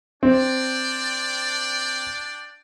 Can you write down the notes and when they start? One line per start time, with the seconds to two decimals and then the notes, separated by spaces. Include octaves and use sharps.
0.23 C4 D4 D5 G5